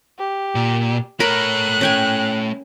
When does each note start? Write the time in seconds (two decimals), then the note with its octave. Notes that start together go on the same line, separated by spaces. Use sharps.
0.19 G4
0.55 A#2
1.20 A3 A#4 C#5 B5 F#6
1.81 C#4 G5 G#5